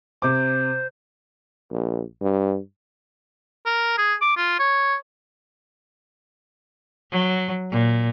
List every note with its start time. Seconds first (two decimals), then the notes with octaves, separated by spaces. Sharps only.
0.22 C3 C5 D6
1.71 A#1
2.21 G2
3.66 A#4
3.98 G#4
4.22 D6
4.37 F4
4.59 C#5
7.11 F#3
7.71 A#2